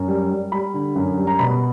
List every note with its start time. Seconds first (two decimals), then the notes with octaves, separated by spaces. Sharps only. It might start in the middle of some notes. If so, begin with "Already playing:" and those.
Already playing: F#2
0.08 G3
0.31 G3
0.52 G3 B5
0.74 D3
0.96 F#2
1.17 G3
1.27 A#5
1.39 B2 B5